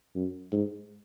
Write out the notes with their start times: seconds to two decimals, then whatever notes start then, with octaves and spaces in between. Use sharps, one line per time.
0.15 F#2
0.52 G#2